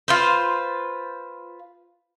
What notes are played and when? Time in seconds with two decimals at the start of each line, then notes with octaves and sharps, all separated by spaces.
0.08 F4 B4 C5